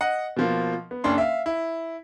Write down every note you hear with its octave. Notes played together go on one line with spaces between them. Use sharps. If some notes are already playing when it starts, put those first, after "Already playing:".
D#5 F#5
B2 F3 A#3
B3
F#1 C#4 D4 C6
E5 F5
E4